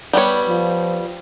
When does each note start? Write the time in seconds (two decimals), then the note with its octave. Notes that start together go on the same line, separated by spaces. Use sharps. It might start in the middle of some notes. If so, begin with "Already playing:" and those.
0.13 G3 B3 C#5
0.48 F3